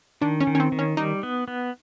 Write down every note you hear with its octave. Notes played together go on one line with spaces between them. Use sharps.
D#3 D4
C#4
D#3
C#4
C4
D#3
C#4
G3 D#4
B3
B3